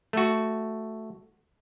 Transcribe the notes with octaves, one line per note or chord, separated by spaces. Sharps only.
A3 F#4